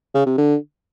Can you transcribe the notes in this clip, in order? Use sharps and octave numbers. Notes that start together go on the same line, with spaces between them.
C#3
C3
D3